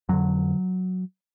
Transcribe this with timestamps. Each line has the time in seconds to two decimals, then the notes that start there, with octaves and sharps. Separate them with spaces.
0.09 F2 D3 F#3